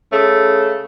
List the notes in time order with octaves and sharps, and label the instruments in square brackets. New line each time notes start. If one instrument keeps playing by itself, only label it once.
[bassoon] C#3 [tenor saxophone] A3